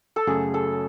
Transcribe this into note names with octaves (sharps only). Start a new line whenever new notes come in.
A4
F#2 C#3 F#3 A3 C#4 G#4
A4